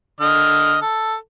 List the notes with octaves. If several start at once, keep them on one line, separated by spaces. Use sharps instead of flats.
D3 D#5 F6
A4